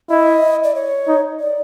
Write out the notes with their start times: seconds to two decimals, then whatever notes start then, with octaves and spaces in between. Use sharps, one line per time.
0.10 E4 D#5
0.64 D5
0.75 C#5
1.08 D#4
1.40 D5